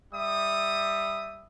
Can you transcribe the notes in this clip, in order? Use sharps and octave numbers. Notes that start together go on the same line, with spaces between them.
G3 E5 D#6